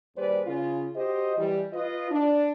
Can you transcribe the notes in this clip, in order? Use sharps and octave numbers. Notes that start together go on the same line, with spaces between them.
D#2 G3 G#4 B4 C5 D5
C#3 F4
F#4 G4 C5 D#5
E3 G3
F4 B4 D#5
D4